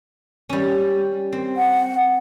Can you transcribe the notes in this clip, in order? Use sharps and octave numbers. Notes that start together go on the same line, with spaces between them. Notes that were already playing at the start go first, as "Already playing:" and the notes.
G3 C#4
C4
F#5